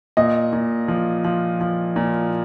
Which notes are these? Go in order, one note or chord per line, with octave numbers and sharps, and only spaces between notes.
A#2 D#5
A#2
F3
F3
F3
A#2